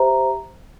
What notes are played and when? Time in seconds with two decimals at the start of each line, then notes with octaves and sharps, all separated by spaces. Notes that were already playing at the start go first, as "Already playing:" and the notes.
Already playing: G4 C5 E5 A#5